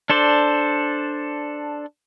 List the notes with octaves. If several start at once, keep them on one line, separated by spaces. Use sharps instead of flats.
D4 A4 C5 D5